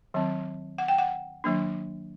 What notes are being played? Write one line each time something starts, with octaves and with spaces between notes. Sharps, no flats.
D#3 F#3 C4
F#5
G5
F#5
D#3 F#3 A#3 D4